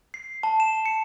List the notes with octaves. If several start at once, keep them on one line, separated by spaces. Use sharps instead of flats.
C7
A5
E7
C#7